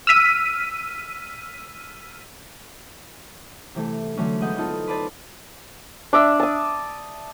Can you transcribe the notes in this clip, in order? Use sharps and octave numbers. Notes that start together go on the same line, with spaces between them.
E6 F6 B6 D#7
C3 E3 A3
D3 E3 F#3 A3 C#4 D4
G#3 B3 D#5 F#5 G6
B3 C4 D#4 F4 A4
B4 C5 D5 A5 B5 A6
D4 D5 E5
A5 D#6